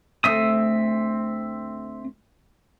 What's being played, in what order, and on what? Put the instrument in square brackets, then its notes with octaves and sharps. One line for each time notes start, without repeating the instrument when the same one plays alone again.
[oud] D2 A3 [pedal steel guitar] C4 E5 D#6